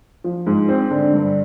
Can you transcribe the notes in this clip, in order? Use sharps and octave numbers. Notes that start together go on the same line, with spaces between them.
F3
G#2
C4
D3
G2